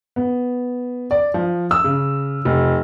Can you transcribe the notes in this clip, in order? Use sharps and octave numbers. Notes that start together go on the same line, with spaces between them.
B3
D5
F3
E6
C#3
F1